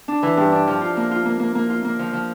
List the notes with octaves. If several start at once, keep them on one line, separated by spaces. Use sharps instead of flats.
D4
E3
G2
D4
F3
F4
A#3
F4
A#3
A#3
A#3
F4
A#3
F3
F3